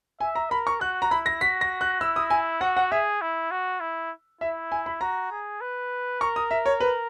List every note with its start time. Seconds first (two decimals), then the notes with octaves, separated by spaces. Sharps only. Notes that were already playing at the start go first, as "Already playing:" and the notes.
0.20 E5 G#5
0.35 A#5
0.50 A#4 B5
0.67 C#6
0.80 F#4 F#6
1.02 A#5
1.11 E4 B5
1.26 A#6
1.41 F#4 B6
1.61 A#6
1.81 F#6
2.00 E4 E6
2.16 D#6
2.30 G#5
2.61 F#4 F#5
2.77 F#5
2.92 G#4 E5
3.22 E4
3.51 F#4
3.80 E4
4.41 E4 E5
4.72 G#5
4.86 B5
5.01 F#4 A#5
5.32 G#4
5.61 B4
6.21 A#4 C#6
6.36 D#6
6.51 E5
6.66 C#5
6.80 B4